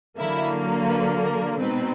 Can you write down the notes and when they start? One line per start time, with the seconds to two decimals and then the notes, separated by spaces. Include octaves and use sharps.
0.18 D3 F#3 A#3 E4 E5
0.89 B4
1.24 A#4
1.59 B2 G#3 C4 D#4 B4